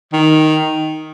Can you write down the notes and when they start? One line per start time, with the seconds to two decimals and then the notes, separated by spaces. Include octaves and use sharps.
0.13 D#3